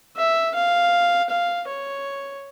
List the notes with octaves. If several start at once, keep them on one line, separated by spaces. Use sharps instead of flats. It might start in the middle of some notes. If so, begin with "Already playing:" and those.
E5
F5
F5
C#5